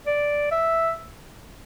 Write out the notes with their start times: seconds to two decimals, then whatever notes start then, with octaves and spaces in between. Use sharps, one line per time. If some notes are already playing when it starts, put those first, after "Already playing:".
0.07 D5
0.51 E5